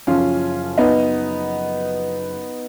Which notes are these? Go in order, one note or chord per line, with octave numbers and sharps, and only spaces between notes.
F#1 F#2 F3 C#4 F4
B3 D#4